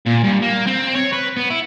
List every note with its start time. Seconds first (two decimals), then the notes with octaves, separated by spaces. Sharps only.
0.06 A#2
0.23 G2
0.42 A#3
0.67 C4
0.94 C#5
1.12 B4
1.37 B3
1.50 E4